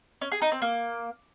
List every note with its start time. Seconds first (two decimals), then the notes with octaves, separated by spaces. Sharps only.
0.21 C#4
0.32 G#4
0.42 D#4
0.52 C4
0.62 A#3